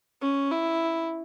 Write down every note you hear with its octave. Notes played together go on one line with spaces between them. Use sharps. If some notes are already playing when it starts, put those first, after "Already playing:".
C#4
E4